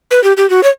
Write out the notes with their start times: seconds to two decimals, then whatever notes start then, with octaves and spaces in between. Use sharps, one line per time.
0.11 B4
0.24 G4
0.37 G4
0.50 F#4
0.63 C#5